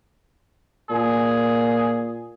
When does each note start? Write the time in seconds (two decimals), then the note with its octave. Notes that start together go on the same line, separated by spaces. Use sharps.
0.90 A#2 G#4